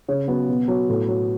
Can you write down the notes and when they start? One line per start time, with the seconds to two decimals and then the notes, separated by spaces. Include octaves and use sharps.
0.08 C#3 C#4
0.28 F#3 B3
0.49 B2
0.68 F#3
0.89 A2
1.08 F#3